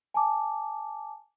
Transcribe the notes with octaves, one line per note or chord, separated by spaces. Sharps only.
G#5 A5 D6